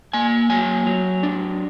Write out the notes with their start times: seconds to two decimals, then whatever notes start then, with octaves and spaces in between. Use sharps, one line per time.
0.13 A#3 G#5
0.50 F#3 G#5
0.86 F#3
1.23 D4